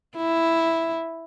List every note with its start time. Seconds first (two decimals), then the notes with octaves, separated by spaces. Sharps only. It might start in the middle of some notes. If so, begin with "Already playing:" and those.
0.16 E4